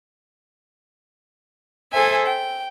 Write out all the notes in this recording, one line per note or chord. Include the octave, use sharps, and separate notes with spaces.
G#4 A4 C5 E5 G#5
G5